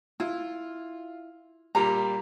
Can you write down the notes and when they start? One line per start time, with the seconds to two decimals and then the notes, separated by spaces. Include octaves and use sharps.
0.20 E4 F4
1.75 A#2 G3 G4 A#5